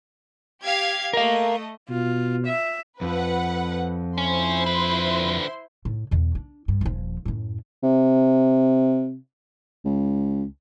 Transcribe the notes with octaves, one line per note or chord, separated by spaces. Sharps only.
G4 F5 G#6
A3 A#4 D#5 F5
B2 F4
E5
F2 B4 F#5
C#4 E4 C5 C6
D3 B4
A2
E2 B2
D4
G2
D#1 F3
F#2 A2
C3
C#2